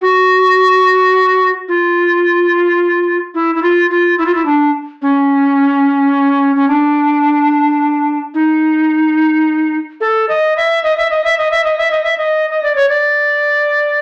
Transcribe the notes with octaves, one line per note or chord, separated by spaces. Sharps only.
F#4
F4
E4
E4
F4
F4
E4
F4
E4
D4
C#4
C#4
D4
D#4
A4
D#5
E5
D#5
E5
D#5
E5
D#5
E5
D#5
E5
D#5
E5
D#5
D#5
D5
C#5
D5